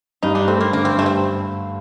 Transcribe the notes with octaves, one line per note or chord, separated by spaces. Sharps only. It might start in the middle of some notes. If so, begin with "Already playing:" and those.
G2 D#4
D4
A3 C4
A#3
D3 A#3
C4
G2 A3
C4